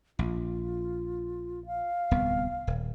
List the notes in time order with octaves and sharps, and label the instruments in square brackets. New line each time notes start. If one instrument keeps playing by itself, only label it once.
[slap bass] A#1 [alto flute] F4
[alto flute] F5
[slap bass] D1 C2 B3
D#1